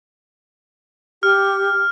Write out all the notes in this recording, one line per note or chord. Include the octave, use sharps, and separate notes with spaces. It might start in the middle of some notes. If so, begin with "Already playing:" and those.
G4 F6